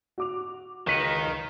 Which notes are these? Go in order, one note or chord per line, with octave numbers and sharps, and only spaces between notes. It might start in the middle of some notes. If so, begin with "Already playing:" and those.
F#4 D6 F7
C#2 D#3 D#4 B4 C#5